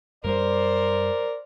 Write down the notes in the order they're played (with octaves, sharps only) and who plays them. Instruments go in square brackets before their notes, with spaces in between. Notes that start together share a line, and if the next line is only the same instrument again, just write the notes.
[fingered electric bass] F#2 G3 [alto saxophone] A#4 [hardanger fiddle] C5 [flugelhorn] D5